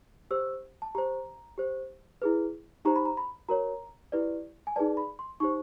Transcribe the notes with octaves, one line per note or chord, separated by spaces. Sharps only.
G4 C5 E6
A5
G4 C5 A#5
G4 C5
E4 G#4 B4
D#4 G4 C5 A#5
B5
A#5
B5
F#4 A#4 C#5 A#5
E4 G4 B4 D5
G#5
D#4 G#4 B4 D5 A5
B5
C6
D#4 G4 C5 C#6